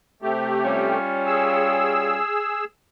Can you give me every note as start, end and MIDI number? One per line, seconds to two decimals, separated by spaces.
0.22 0.98 48
0.22 0.98 57
0.22 0.98 67
0.65 2.18 55
0.65 2.18 61
0.65 2.18 65
1.26 2.64 68
1.26 2.64 88